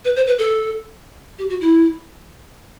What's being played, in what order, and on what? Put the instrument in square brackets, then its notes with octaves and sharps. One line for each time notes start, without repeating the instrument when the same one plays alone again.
[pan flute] B4
C5
B4
A4
G4
F#4
E4